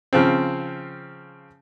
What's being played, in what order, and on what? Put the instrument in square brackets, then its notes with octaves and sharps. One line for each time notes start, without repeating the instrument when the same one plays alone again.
[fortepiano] C#3 F3 C4